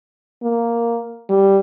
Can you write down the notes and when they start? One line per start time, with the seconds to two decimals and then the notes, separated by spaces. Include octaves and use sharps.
0.43 A#3
1.30 G3